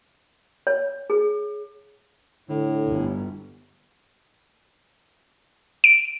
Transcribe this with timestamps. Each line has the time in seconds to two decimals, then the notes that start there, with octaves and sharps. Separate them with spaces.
0.67 C#5
1.10 G#4
2.49 A2 D3
2.89 G1
5.84 D7